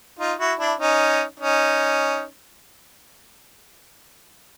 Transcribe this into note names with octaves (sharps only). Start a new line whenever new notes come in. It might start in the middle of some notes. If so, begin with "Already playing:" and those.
D#4 F4
E4 F#4
D4 E4
C#4 D#4
C#4 D#4